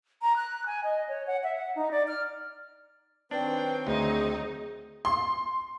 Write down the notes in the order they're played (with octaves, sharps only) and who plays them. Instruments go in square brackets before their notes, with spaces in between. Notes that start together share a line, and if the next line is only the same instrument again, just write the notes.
[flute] A#5
F#6
G#5
D#5
C#5
F#5
E5
F#5
D#4
D5
F6
[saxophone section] D#3 F#3 C4 [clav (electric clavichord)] D4 [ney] B4 [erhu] G5
[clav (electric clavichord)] D2 [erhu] D#4 [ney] G#4
[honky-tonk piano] C6